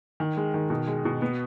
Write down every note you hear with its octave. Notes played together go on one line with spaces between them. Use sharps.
D#3
G#3
D#3
B2
G#3
B2
B3